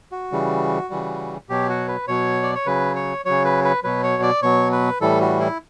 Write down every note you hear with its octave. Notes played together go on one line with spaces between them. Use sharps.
F#4
C#3 E3 G3
C#3 E3 G3
B2 F#3 G4
F#4
B4
B2 F#3 C#5
D5
C#5
C#3 F#3 B4
C#5
C#3 F#3 C#5
B4
B4
B2 F#3 B4
C#5
D5
B2 F#3 C#5
B4
A2 E3 G3 A4
F#4
E4